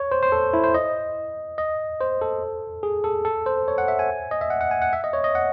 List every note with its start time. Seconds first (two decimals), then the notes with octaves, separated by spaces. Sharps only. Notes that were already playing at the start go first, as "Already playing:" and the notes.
Already playing: C#5
0.12 C5
0.23 C5
0.32 A4
0.53 E4
0.64 C5
0.74 D#5
1.58 D#5
2.01 C5
2.22 A4
2.83 G#4
3.04 A4
3.25 A4
3.46 C5
3.68 C#5
3.78 F#5
3.88 E5
3.99 G#5
4.31 D#5
4.41 E5
4.50 F#5
4.61 F#5
4.71 G#5
4.82 F#5
4.93 E5
5.04 D#5
5.13 C#5
5.24 D#5
5.35 F#5